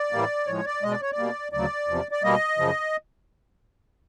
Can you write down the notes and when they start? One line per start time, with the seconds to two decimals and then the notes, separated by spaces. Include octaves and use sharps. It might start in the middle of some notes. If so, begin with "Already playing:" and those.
Already playing: D5
0.12 A2 E3 G3 A#3
0.47 A2 F3 G#3 C#5
0.65 D5
0.83 B2 G#3 D#5
0.91 D5
1.01 C#5
1.12 D5
1.17 B2 G3 A#3
1.52 D2 C#3 F#3 D5
1.88 E2 C3 F3
2.11 D5
2.23 B2 G3 A#3 D#5
2.58 F#2 C#3 F3